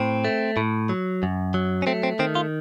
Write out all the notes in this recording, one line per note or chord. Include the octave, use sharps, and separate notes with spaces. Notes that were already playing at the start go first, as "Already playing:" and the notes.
Already playing: A2 C4
A3
A2
F#3
F#2
F#3
C#4
A3 C4
C4
D#3 C4
F4